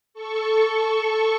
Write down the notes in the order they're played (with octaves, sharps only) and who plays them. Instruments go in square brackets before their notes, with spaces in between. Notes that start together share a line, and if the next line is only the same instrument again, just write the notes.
[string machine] A4 C#6